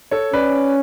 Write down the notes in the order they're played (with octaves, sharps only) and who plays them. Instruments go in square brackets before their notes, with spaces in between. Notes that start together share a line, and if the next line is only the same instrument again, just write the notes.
[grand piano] A4 C#5
[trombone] C#4 [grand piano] B4 D5